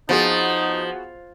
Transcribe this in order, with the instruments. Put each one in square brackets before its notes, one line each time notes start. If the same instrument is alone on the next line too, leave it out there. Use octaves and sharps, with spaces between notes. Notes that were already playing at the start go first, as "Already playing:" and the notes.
[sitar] F3 [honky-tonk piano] B3 F#4 G#4 [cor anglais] D#4